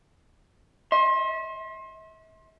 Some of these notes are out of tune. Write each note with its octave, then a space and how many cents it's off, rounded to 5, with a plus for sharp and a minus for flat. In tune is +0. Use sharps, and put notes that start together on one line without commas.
E5 -40 C6 +30